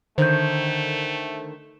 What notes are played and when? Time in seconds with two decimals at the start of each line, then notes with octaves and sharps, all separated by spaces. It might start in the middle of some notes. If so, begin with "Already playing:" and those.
0.18 D3 D#3 A3 C5 G6